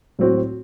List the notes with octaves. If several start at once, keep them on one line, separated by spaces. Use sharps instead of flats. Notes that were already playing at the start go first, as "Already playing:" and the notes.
A2 F#3 C4 F#4